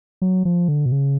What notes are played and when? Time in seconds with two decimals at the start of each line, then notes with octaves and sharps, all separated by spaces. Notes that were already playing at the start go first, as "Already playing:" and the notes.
0.22 F#3
0.45 F3
0.68 D3
0.86 B2
0.92 C#3